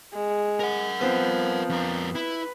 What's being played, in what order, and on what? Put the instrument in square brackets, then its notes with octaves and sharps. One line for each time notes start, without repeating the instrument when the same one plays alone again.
[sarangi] G#3
[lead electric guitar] A#4 F#5
[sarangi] F3 [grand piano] B3 C4
[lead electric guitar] F2 A#4
[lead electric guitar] E4 [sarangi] B4